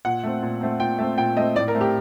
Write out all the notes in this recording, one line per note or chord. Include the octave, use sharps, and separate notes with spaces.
A#2 F#5
A3 C4
A#2
A3 C4
A#2 G5
A3 C4
A#2 G5
A3 C4 D#5
A2 D5
A#4
A3 C4
G4